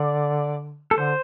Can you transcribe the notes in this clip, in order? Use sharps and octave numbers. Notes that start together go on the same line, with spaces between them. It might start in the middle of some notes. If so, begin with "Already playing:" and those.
Already playing: D3 D5
A4
D3 C5